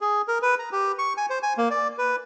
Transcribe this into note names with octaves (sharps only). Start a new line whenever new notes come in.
G#4
A#4
B4
A#5
G4
C#6
G#5
C5
G#5
A#3
D5
B4